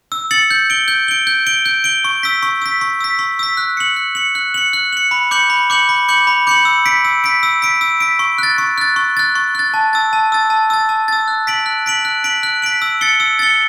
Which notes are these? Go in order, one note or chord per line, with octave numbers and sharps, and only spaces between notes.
E6
A6 C#7 F#7
G6
D7 G7
G6
D7 G7
G6
D7 G7
G6
D7 G7
C#6
E6 B6
C#6
E6 B6
C#6
E6 B6
C#6
E6 B6
F#6
C#7 F#7
F#6
C#7 F#7
F#6
C#7 F#7
F#6
C#7 F#7
B5
D6 G6 C#7 F#7
B5
D6 G6 C#7 F#7
B5
D6 G6 C#7 F#7
B5
D6 G6 C#7 F#7
E6
B6 D7
E6
B6 D7
E6
B6 D7
E6
B6 D7
C#6
F#6 A6
C#6
F#6 A6
C#6
F#6 A6
C#6
F#6 A6
A5
E6 A6
A5
E6 A6
A5
E6 A6
A5
E6 A6
F#6
B6 D7 F#7
F#6
B6 D7 F#7
F#6
B6 D7 F#7
F#6
B6 D7 F#7
E6
A6 C#7 G7
E6
A6 C#7 G7